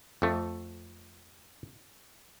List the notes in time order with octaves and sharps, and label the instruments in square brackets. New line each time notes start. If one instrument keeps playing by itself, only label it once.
[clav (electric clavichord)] F2 A3